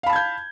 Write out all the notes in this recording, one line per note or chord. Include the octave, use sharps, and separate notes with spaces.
F5 A5 B5 G6 G#6